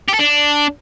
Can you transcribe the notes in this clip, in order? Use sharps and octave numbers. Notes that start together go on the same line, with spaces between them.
G4
A4
D4